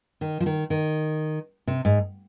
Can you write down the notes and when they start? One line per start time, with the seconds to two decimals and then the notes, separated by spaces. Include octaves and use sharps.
0.21 D#3
0.40 F3
0.46 D#3
0.70 D#3
1.67 C3
1.85 G#2